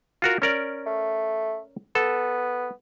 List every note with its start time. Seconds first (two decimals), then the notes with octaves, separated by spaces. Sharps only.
0.22 F4 F#4 A#4
0.42 C#4 A#4 D5
0.86 A3
1.95 B3 A4